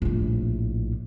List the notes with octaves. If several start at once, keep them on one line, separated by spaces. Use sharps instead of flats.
A#1 A2